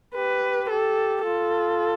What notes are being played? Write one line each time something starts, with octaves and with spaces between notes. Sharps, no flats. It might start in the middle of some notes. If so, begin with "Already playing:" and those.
G4 B4
G4 A4
F4 A4